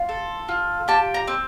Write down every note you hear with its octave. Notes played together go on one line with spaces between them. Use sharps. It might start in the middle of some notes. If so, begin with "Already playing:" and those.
Already playing: F4
A4
F4
G4 A5
A#5
C4